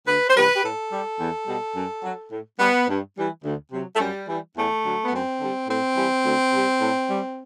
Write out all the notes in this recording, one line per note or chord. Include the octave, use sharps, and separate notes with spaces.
D2 B4
C5
C3 E3 G3 B4
G4
A2 A4
G3
E2
B2 G3
F#2
F#3
A2
G3 B3
G2
E3 G3
D2
C3 F#3
A3
F#2 G3
E3 G3
E2 A3
D3 F#3
B3
F#2 C4
D3 G3
A2 C4
E3 G3
D2
C3 G3
A2
G3